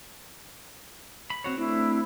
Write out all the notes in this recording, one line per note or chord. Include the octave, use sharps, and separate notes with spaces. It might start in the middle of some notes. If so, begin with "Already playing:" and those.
B5
C4 F#4 C#5
A3 C4 D4 E4